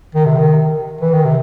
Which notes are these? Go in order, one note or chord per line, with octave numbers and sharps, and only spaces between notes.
D#3
C3
D#3
E3
D#3
C3